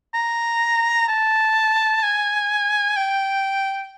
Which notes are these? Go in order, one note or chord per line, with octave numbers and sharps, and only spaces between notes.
A#5
A5
G#5
G5